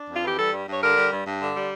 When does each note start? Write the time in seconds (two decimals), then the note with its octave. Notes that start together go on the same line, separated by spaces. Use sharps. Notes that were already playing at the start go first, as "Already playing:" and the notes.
Already playing: D4
0.09 F2
0.15 F4
0.23 E3 G4
0.38 G3 A4
0.52 G2
0.67 G2 C#5
0.82 D3 A#4
0.96 G3
1.12 G2
1.26 G2
1.41 D3
1.55 G3